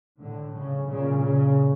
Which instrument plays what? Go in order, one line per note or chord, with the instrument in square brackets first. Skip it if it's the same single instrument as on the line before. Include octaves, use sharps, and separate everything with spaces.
[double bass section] A2 D3
C#3
A#2 C#3
C#3